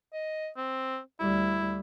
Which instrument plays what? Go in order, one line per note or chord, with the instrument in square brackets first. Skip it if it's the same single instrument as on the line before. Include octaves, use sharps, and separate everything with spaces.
[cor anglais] D#5
C4
[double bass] D2 G3 [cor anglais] E4